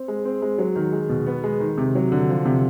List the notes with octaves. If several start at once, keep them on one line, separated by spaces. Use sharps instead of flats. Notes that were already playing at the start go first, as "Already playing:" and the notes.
Already playing: C4
G#3
C4
G#3
F#3
D#3
G#3
B2
B3
G#3
D#3
C3
F#3
D3
F3
C3